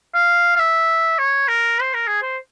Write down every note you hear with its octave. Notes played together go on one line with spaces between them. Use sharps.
F5
F5
E5
C#5
A#4
C5
A#4
G#4
C5